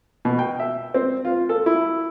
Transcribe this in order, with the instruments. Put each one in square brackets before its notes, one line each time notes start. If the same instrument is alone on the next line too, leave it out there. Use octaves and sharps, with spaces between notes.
[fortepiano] B2
G5
E5
C4
F4
A4
E4